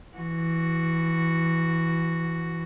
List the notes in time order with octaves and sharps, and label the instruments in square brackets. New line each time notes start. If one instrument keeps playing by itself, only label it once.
[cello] E3 F#4